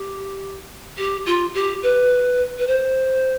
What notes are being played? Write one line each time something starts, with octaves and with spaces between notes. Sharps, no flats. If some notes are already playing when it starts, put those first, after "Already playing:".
Already playing: G4
G4
F4
G4
B4
B4
C5